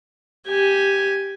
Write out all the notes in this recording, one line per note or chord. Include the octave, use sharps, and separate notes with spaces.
G4 G#5